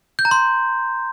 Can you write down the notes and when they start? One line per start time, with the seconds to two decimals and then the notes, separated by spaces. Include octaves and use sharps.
0.19 G6
0.25 A#5
0.31 C6